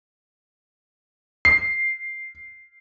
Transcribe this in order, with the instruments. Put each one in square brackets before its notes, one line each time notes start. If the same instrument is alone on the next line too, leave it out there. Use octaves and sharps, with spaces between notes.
[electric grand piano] C7